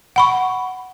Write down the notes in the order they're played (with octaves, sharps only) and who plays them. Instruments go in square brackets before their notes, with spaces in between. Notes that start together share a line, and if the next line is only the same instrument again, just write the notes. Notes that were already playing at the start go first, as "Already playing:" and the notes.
[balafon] F#5 B5 C#6